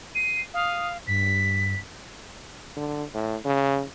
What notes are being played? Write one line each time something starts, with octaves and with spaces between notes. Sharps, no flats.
C7 D#7
F5 D#6
G2 B6
D3
A2
C#3